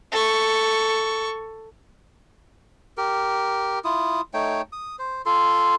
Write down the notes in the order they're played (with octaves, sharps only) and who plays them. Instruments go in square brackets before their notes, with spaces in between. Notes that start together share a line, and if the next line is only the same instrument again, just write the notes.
[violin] A4 C#6
[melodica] G4 A#4
E4 F4 D#6
A3 D#4 C#5 G5
D#6
C5
F4 A4 C6